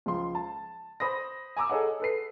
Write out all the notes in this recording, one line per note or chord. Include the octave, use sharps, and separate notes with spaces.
C#2 F3 C6
A5
C5 B5 D#6 A#6
G#5 A#5 D6 E6
G#4 A4 C#5 D#5 F#5
A4 B4 C7